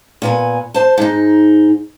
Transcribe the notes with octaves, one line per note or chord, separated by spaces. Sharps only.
A#2 B3 G#5
C5 A5
G#2 D#4